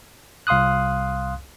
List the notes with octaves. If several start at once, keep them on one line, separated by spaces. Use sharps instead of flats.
C2 F5 C6 D#6 F#6